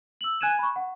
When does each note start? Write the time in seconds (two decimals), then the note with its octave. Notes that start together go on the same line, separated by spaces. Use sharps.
0.21 E6 F#7
0.41 G#5 F#6 G#6 D#7 E7
0.59 B5 C#6
0.76 F#5